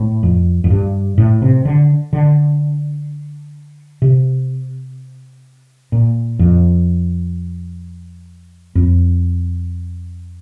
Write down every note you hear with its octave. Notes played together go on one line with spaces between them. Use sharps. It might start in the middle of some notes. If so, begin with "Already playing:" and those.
Already playing: A2
F2
F2
G2
A2
C3
D3
D3
C3
A#2
F2
F2